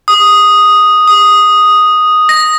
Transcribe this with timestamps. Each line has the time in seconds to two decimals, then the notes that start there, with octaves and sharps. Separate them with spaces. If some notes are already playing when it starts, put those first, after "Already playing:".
0.08 D#6
1.08 D#6
2.29 A#6